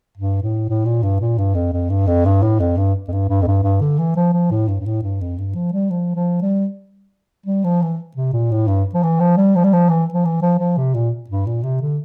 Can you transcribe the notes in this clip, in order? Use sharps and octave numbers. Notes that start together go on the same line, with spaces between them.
G2
A2
A2
A#2
G2
A#2
G2
F2
F2
G2
F2
G2
A2
F2
G2
F2
G2
G2
F2
G2
G2
D3
E3
F3
F3
A2
G2
G2
A2
G2
F2
G2
F3
G3
F3
F3
G3
G3
F3
E3
C3
A#2
A2
G2
F3
E3
F3
G3
F3
G3
F3
E3
F3
E3
F3
F3
C3
A#2
G2
A#2
C3
D3